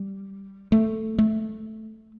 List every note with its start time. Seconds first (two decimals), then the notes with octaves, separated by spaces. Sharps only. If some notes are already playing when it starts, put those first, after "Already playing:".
Already playing: G3
0.72 A3
1.18 A3